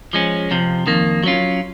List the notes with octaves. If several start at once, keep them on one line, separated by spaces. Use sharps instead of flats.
F3 G#3 C#4
F2 C3 F3
F2 D#3 A#3
F#3 C#4 F4